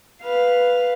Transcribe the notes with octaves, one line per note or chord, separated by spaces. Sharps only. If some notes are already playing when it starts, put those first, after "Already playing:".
B4 F5